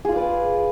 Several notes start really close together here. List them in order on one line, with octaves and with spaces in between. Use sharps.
G#4 F4 D5 B4